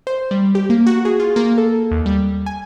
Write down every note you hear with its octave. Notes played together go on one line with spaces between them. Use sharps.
C5
G3
G4
A#3
F#4
G#4
F4
A#3
A4
D#2
G3
G#5